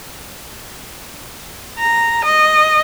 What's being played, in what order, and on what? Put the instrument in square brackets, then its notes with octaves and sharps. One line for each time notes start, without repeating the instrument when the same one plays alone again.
[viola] A#5
D#5